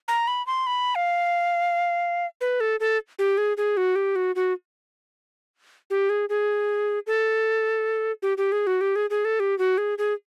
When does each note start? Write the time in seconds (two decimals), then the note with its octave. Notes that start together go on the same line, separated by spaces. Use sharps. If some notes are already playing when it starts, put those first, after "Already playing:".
0.08 A#5
0.27 B5
0.47 C6
0.67 B5
0.95 F5
2.41 B4
2.60 A4
2.80 A4
3.19 G4
3.38 G#4
3.57 G#4
3.77 F#4
3.96 G4
4.16 F#4
4.36 F#4
5.90 G4
6.10 G#4
6.29 G#4
7.07 A4
8.22 G4
8.38 G4
8.52 G#4
8.67 F#4
8.81 G4
8.96 G#4
9.10 G#4
9.25 A4
9.40 G4
9.59 F#4
9.78 G#4
9.98 G#4